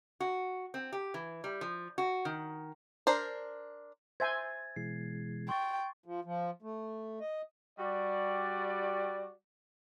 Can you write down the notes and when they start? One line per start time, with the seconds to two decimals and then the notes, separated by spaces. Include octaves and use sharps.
0.20 F#4
0.74 C4
0.92 G4
1.14 E3
1.44 G3
1.61 F3
1.98 F#4
2.25 D#3
3.07 D4 A#4 C5
4.20 C5 E5 G#5 G#6 A6
4.76 B2 E3 G#3 C7
5.49 G5 C6 C#6 A6
6.06 F3
6.24 F3
6.62 A3
7.20 D#5
7.79 G3 F#4 D5